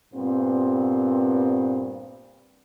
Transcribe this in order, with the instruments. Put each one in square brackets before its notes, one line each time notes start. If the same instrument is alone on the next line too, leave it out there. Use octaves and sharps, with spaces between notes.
[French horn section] G2 A#2 B3 C4